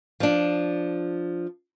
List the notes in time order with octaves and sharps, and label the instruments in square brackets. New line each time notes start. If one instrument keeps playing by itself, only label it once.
[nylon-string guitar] F3 D4